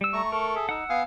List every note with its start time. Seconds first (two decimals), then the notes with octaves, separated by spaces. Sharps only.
0.01 G3 E6
0.13 A3 A#5 C#6
0.32 A4 A#4
0.55 G#4 E5
0.69 D#4 F#5 E6
0.89 B3 F5 G#5 D#6